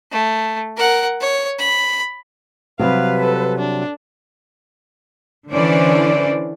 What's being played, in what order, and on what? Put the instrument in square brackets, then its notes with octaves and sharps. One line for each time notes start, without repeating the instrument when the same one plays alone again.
[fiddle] A3
A#4 F#5
C#5
B5
[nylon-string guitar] C3 F#3 G3 [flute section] B4 [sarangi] F5
[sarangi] A4
D4
[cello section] D3 E3 C#4 D4 C5 D5